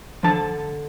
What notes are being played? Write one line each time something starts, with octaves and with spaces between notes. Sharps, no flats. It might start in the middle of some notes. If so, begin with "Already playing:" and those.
D3 F3 A5